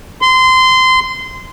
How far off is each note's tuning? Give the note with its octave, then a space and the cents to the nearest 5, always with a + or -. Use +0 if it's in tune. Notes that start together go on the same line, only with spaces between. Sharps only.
C6 -20